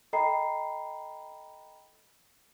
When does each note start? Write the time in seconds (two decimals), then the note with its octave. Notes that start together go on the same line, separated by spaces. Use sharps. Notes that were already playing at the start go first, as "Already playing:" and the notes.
0.13 A4 D#5 G5 A#5 B5 C7